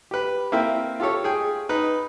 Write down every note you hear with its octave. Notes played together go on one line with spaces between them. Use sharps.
G4 B4
A#3 C4 E4 E5 G5
F4 G4 A4 C#5
G#4 G5
D#4 B4